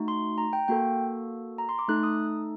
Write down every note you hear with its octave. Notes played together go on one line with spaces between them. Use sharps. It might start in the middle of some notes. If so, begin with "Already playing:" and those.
Already playing: A3 D#4 F#4
C6
A#5
G5
A#3 F#4 A4 G5
A#5
C6
D6
A3 D#4 A4 F#6
D#6